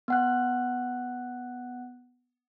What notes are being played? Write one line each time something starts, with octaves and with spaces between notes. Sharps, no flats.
B3 F#5 F#6